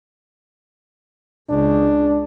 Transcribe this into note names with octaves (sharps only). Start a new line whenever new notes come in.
C#2 D4